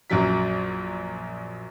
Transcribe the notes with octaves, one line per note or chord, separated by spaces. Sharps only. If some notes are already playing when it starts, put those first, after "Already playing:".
A#1 F#2 F#3 B6